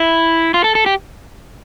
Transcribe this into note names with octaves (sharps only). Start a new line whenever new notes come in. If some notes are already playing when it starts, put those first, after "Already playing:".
Already playing: E4
F4
A4
A4
G4